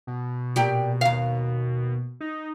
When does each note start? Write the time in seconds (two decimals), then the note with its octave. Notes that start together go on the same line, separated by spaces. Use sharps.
0.07 B2
0.56 A#2 G4 D5
1.01 D#2 F5
2.21 D#4